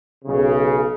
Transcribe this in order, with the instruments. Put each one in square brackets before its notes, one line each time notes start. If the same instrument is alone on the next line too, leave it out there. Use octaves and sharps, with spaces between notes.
[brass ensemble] B1 C#3